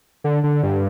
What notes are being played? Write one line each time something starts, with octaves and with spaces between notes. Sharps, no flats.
D3
D3
G2